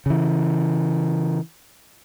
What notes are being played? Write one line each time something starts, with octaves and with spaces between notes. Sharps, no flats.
C#3 E3